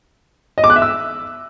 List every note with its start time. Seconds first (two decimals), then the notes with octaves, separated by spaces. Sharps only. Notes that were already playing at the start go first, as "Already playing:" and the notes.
0.58 D#5
0.64 D6
0.70 F#6
0.76 E5
0.82 E6